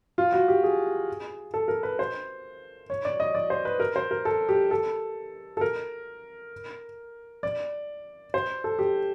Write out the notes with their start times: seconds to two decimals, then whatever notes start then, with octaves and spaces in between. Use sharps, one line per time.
0.18 F4
0.32 F#4
0.48 G4
0.63 G#4
1.54 A4
1.68 A#4
1.83 B4
1.99 C5
2.90 C#5
3.05 D5
3.20 D#5
3.35 D5
3.50 C5
3.65 B4
3.80 A#4
3.96 C5
4.11 A#4
4.25 A4
4.49 G4
4.71 A4
5.57 A4
5.61 A#4
7.43 D5
8.34 C5
8.64 A4
8.79 G4